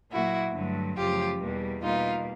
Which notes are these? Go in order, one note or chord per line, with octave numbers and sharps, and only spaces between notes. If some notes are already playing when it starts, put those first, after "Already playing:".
A#2 F#3 A#3 E4 F#4
G2 D3 F#3 A3
F#2 C#3 F3 A3 F4 G4
E2 B2 G3 A#3
B2 G3 A#3 D#4 F4